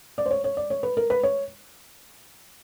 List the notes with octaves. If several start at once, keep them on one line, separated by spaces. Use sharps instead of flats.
D5
C5
C#5
C#5
D5
C#5
B4
A#4
B4
C#5